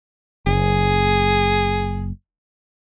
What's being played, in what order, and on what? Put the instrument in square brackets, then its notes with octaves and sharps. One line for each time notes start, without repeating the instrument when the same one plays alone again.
[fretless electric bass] F#1 [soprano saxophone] G#4